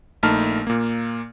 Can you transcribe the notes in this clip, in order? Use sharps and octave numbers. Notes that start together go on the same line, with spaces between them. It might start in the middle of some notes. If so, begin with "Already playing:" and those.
A#1 A3 A#3 D#4 A5 F6
A#2 A#3